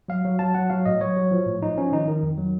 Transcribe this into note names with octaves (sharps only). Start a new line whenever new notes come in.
F#3 F5
F#3
F#3 A5
F#3 F#5
F#3 F5
A2 D#5
F#3 C#5
F#3
F3
A2
F3 D#4
F3 C#4
D#3 D#4
D#3
F2
F#3